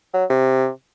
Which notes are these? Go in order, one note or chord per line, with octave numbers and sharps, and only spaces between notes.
F#3
C3